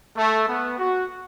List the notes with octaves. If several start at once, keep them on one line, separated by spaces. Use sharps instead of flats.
A3
B3
F#4